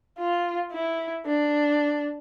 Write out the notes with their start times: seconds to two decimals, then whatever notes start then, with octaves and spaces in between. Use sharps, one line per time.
0.18 F4
0.72 E4
1.26 D4